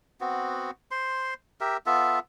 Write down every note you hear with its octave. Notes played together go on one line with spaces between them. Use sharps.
B3 C4 F#4
C5 C6
G4 A#4 E5
B3 F4 A4 E5